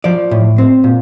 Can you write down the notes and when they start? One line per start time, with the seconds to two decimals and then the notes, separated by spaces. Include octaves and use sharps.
0.04 F3 D5
0.31 A2
0.58 C4
0.84 A#2